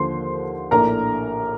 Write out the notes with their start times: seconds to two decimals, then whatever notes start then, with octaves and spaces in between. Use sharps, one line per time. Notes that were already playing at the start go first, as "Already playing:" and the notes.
Already playing: D#2 D3 F3 C5 C6
0.71 A#1 A2 A3 D4 A#4 A#5